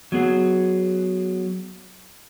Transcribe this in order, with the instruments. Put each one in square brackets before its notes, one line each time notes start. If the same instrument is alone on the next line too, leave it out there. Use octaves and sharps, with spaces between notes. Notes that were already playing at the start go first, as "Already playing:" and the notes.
[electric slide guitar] F#3 B3 G#4